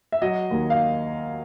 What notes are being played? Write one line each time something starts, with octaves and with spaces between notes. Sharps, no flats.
E5
F#3 D#5
D#2
F5